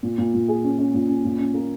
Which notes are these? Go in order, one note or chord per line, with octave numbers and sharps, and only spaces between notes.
A#2
A#2
A#2
G#4
C#4
C#4
A#2
C#4
A#2
C#4
A#3